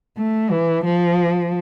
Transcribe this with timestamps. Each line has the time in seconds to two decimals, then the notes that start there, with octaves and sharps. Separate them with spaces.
0.17 A3
0.51 E3
0.85 F3